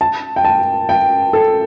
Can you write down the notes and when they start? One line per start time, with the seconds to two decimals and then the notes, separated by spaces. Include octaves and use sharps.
0.01 A5
0.36 G5
0.45 A5
0.89 G5
1.33 A4